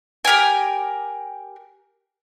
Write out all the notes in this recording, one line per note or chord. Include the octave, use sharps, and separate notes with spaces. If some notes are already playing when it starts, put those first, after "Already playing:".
G4 A#4 G5 G#5